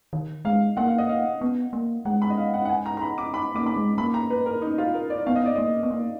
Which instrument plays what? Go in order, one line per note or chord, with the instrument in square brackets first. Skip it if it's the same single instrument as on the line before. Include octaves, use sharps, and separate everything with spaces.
[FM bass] D#3
[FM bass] G#3 [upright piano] F5
[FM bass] A#3 [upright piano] F#5
[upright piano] F5
D#5
F5
[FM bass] B3
A#3
[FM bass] G#3 [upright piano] F#5
[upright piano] B5
D#5
F5
F#5
F#5
G#5
A#5
A#5
B5
D6
B5
[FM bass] A#3 [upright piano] D6
[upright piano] B5
[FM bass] G#3
[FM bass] A#3 [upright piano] B5
[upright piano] A#5
B4
A#4
D#4
F4
A#4
D5
[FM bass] B3 [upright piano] F5
[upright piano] D#5
D5
[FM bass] A#3 [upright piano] D#5
[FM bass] B3
A#3